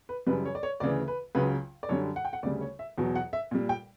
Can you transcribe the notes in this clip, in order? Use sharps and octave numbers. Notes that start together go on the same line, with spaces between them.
B4
F#2 C#3 E3 G3 B4
C#5
D5
C#5
D2 C#3 E3 D5
B4
C#2 C#3 F#3 B4
D5
F#2 D3 G3 C#5
F#5
G5
F#5
D2 C#3 G3 D5
C#5
E5
E2 B2 F#3
F#5
E5
A#2 G3
G5